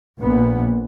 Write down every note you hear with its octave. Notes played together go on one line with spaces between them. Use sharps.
A#1 A#2 B3